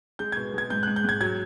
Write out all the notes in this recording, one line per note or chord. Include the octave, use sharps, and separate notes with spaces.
G#3 G6
B2 G#6
G#3 G#6
G#2 G6
G#2 F#6
G6
G#2 G#6
F#3 G#6